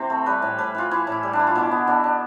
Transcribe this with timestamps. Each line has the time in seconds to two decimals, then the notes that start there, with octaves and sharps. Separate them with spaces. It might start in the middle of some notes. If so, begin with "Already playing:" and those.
Already playing: C3 E3 C4 C5
0.10 A3
0.26 G3 B4
0.42 A2
0.58 A2 B4
0.75 E3 F4
0.91 E3 E4
1.07 A2 E4
1.23 G3
1.33 D4
1.40 E3
1.47 F4
1.55 B2 E4
1.71 B3
1.87 B2 D4
2.04 D4